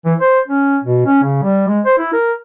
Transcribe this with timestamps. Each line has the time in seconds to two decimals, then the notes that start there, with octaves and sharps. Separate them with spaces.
0.05 E3
0.20 C5
0.48 C#4
0.84 B2
1.06 C#4
1.23 C#3
1.43 G3
1.68 G#3
1.85 C5
1.98 E4
2.12 A#4